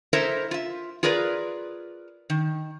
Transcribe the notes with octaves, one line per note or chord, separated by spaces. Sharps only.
E4 A4 A#4 C5 D#5 E5
F4 E5
F4 G#4 A#4 B4 D5
D#3